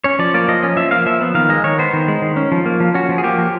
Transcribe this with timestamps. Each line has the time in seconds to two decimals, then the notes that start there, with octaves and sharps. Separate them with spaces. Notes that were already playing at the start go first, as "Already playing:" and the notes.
0.04 C#4 C#5
0.19 F3 D5
0.34 A#3 D5
0.48 F3 D#5
0.62 C#4 D#5
0.77 F3 E5
0.91 A#3 F5
1.06 F3 E5
1.21 B3
1.35 D#3 F5
1.49 G#3 D#5
1.64 D#3 C#5
1.79 B3 C5
1.93 D#3
2.08 G#3
2.22 D#3
2.36 C#4
2.52 F3
2.66 A#3
2.80 F3
2.94 C#4 F#4
3.09 F3
3.18 G#4
3.24 A#3 G4
3.38 F3